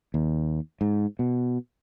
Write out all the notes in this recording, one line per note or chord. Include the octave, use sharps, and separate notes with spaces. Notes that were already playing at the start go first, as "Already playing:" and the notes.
D#2
G#2
B2